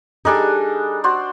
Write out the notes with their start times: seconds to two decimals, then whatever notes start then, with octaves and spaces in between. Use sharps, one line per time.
0.25 G3 D4 D#4 G#4 A4 G#5
1.04 F#4 C5 D5